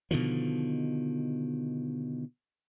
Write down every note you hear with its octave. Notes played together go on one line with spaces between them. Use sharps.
B2 D3 D#3 F3